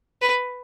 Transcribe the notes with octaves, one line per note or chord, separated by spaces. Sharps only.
B4